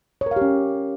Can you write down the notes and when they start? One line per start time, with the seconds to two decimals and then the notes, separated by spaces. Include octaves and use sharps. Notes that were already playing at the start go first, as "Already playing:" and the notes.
0.21 C#5
0.26 A#4
0.31 F5
0.36 G4
0.41 C#4